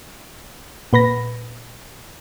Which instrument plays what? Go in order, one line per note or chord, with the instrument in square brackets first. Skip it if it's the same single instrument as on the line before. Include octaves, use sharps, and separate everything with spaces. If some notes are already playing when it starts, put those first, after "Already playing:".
[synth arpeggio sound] A#2 B4 B5 A#6